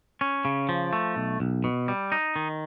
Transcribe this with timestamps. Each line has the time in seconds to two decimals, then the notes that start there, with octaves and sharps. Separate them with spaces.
0.21 C#4
0.45 C#3
0.69 F3
0.93 A3
1.16 B1
1.40 B1
1.64 B2
1.88 G3
2.12 D#4
2.36 D#3